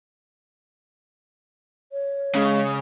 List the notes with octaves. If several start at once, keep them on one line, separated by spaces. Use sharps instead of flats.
C#5
C#3 G#3